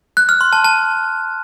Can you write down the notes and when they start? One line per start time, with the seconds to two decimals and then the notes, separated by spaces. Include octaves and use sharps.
0.17 F#6
0.29 F6
0.41 C6
0.53 A5
0.64 A5